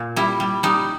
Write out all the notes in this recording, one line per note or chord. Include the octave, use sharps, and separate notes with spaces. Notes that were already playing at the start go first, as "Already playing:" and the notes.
Already playing: A#2
G3 E4
G3
G3 D#4